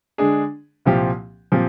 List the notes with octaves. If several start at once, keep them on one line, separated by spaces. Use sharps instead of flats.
D3 G#3 D4 G#4
C2 A#2 F3 C4 G4
A#2 F3 C4 G4